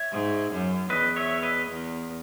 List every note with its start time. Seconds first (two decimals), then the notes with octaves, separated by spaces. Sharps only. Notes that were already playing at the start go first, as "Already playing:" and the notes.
Already playing: C#5 E5
0.12 G#2
0.52 F#2
0.90 E2 B4 D#5
1.16 C#5 E5
1.43 B4 D#5
1.70 E2